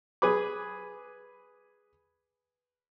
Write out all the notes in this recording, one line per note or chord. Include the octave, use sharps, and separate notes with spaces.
G#4 B4 B5 D6